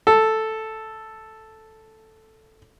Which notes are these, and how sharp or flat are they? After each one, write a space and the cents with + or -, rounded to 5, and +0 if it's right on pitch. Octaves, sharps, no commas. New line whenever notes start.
A4 +0